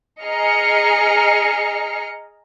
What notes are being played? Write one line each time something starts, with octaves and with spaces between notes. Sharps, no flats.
G#4 D#5 A#5 F6 C7 C#7